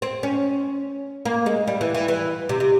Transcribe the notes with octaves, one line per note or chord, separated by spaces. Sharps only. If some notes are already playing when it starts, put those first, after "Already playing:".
C4
C#4
A#3
G#3
G3
E3
E3
E3
C3
C3